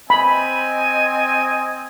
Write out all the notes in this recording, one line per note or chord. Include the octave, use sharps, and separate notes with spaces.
C4 D#5 G#5 B5